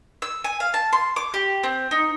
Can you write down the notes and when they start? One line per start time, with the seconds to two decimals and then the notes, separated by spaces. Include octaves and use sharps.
0.22 E6
0.44 G#5
0.60 F5
0.74 A5
0.93 C6
1.16 D6
1.34 G4
1.63 C4
1.91 D#4